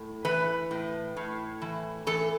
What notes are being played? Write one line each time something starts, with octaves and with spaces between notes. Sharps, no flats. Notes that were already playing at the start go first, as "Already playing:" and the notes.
Already playing: A2
E3 B4
A2
A2
E3
E3 A4